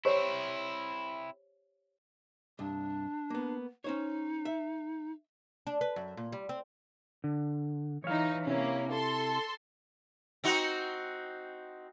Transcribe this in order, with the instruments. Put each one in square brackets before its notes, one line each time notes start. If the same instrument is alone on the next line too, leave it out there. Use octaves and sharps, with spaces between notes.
[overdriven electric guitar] C4 E4 [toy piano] G4 C5 C#5
[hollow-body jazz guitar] C2 G2 [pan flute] D4
[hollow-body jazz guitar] A#3 B3
[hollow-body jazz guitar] C#4 C5 C#5 [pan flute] D#4
[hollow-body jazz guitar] E5
[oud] D4
B4
F#2
A#2
G3
C4
[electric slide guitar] D3
[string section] E3 D#4 [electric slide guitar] C#5 F5
[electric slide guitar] C3 E4 [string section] A#3 C#4
[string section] A4 C6
[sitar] C4 D#4 F#4